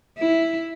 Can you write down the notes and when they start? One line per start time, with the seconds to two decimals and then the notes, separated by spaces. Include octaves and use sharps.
0.18 E4